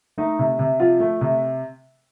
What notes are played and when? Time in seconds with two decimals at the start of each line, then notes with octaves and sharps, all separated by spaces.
0.18 A3 D#4
0.39 C3
0.59 C3
0.80 F3 F4
1.00 A3
1.21 C3